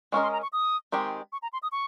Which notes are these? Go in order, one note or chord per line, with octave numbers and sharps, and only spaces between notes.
G#3 C#4 F4 A#4 D#5 C#6
C6
A#5
C#6
D#6
D#3 G#3 C4 G4
C#6
A#5
C6
D#6
C#6